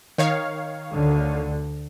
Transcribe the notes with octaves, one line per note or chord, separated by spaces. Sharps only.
D#3 C#5 F5
D2 D3